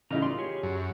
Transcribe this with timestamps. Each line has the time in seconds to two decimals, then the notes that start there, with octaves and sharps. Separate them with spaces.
0.11 C#3 A3 D#4 E4 A#5
0.22 F4 D5 C6
0.38 G4 G#4 C#5
0.63 F#2